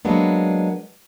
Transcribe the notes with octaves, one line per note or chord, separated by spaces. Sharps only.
F#3 G#3 A#3 B3 D4